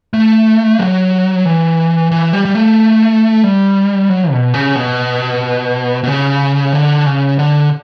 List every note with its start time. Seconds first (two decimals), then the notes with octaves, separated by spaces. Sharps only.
0.14 A3
0.79 F#3
1.45 E3
2.12 E3
2.33 G3
2.45 G3
2.55 A3
3.44 G3
4.09 F#3
4.31 B2
4.54 C#3
4.75 B2
6.04 B2
6.07 C#3
6.73 D3
7.06 C#3
7.39 D3